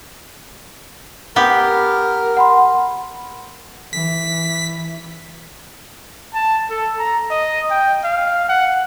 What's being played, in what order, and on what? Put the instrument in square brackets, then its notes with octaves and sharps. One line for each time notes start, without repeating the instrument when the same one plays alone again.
[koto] B3 G4 [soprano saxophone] A#4
[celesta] F#5 B5 C6
[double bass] E3 [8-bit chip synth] B6
[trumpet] A5
A4
A#5
D#5
G5
F5
F#5